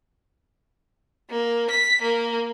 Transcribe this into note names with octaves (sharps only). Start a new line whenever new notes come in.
A#3
B6
A#3